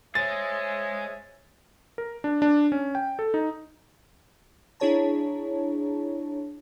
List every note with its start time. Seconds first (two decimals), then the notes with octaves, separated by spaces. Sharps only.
0.15 G#3 G#4 C5 C#5 E5 A6
1.98 A#4
2.24 D4
2.42 D4
2.72 C#4
2.95 G5
3.19 A4
3.34 D#4
4.80 D4 E4 G#4 C#5 A5 A#5